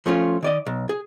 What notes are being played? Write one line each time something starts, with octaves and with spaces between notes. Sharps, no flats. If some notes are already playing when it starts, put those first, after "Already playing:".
F3 A3 C#4 F4
D#3 D5 D#5
B1
G#4